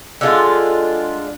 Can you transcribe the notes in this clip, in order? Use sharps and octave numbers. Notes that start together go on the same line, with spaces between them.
D3 G#3 D4 F4